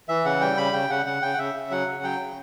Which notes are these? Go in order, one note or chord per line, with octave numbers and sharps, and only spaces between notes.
E3 E5
C#3 F#5
G3 G5
C#3 B5
C#3 G5
C#3 F#5
C#3 F#5
C#3 G5
F#5
C#3 E5
C#3
F#3 F#5
C#3
F#3 G5
C#3